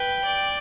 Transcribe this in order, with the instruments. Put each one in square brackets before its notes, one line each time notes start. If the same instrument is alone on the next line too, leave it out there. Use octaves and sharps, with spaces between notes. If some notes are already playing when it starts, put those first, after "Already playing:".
Already playing: [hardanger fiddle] B4 [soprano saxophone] G5
[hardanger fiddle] D5